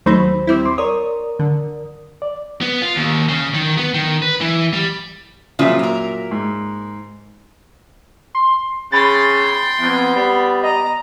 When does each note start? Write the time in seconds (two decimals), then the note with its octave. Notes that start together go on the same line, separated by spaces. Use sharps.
0.06 D#2 F#3 A3 D#4 C5 B5
0.47 G3 C4 E4
0.65 C6 D6
0.78 A#4 C#5 D5 D#6
1.39 D3
2.22 D5
2.61 B3
2.82 F4
2.96 D#2
3.29 C#3
3.54 D#3
3.78 B3
3.94 D#3
4.22 B4
4.41 E3
4.73 G3
5.59 A#2 C#3 F3 F#3 F4 E5
5.79 A#3 A#4
6.31 G#2
8.35 C6
8.92 C#3 G5 B5 C6 A6
9.80 F2 B3
10.16 G3
10.63 D#5 A#5